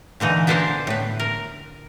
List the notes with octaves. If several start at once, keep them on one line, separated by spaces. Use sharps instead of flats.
A#2 D3 E3 D#4
B3 D4 A4 A#4 C5 A5
A2 B4
A#4